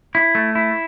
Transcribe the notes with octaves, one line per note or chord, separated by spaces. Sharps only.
E4
A3
E4